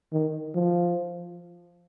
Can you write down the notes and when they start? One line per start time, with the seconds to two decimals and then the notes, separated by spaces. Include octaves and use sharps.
0.12 D#3
0.55 F3